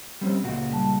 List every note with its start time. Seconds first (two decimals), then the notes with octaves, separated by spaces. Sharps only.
0.21 G3 C4 C#4
0.42 C#2 A#2 F#4
0.72 G3 A5